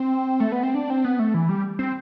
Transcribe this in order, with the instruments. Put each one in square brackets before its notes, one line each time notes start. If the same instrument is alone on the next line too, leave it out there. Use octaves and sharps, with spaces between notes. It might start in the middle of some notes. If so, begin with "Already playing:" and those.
Already playing: [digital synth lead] C4
A3
B3
C4
D4
C4
B3
A3
E3
G3
C4